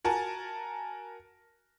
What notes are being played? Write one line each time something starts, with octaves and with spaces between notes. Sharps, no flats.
F#4 A#4 G#5 A5